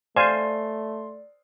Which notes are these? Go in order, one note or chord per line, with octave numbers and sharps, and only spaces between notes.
A3 C5 D5 F5 G#5 C6 A6